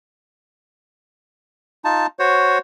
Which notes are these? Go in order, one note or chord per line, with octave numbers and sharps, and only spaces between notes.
D#4 F4 A5
F#4 C5 C#5